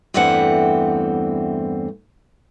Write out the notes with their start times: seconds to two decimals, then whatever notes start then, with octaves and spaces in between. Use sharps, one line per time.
0.14 E2 G2 E3 A3 C4 F#5